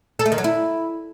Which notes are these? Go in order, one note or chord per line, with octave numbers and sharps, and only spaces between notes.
A4
A3
D#3
F#3
E4